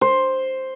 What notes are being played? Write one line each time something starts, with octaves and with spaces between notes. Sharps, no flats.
C5